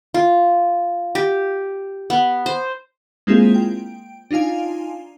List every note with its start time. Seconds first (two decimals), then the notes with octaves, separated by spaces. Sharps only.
0.14 F4
1.15 G4
2.10 B3
2.46 C5
3.27 G#3 A#3 C4 E4 F4 G#4
3.54 G5
4.31 D4 D#4 F4 F5 G#5